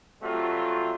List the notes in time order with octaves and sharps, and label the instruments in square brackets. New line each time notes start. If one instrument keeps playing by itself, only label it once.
[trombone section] C3 F#3 G3 A3 F4 F#4